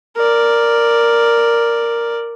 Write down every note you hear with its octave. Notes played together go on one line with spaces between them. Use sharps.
A#4 D5